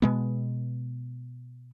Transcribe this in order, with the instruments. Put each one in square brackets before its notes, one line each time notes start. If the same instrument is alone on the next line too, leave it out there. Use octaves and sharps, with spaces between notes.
[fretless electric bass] B2 G#3 B3